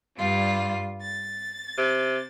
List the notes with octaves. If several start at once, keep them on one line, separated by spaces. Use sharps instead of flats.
G2 G3 F4
A6
C3